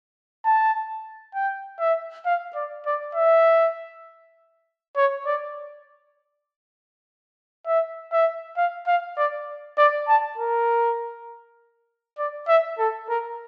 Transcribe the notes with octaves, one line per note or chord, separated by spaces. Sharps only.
A5
G5
E5
F5
D5
D5
E5
C#5
D5
E5
E5
F5
F5
D5
D5
A5
A#4
D5
E5
A4
A#4